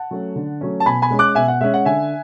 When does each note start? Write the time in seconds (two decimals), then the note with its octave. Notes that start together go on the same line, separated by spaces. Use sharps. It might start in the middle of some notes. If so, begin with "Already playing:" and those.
Already playing: F#5 A5
0.11 F#3 A3 C#4
0.36 D3
0.61 F#3 A3 C#4
0.80 A5
0.86 B2 G#5 B5
1.02 G#5 B5
1.10 G#3 C#4
1.19 D6 F#6
1.35 B2 E5 G#5
1.48 F#5
1.61 G#3 C#4 E5
1.74 F#5
1.85 D3 E5 G#5